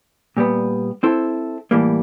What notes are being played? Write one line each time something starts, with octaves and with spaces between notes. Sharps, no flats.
A#2 G3 B3
C4 E4 A4 C5
A2 E3 G3 A#3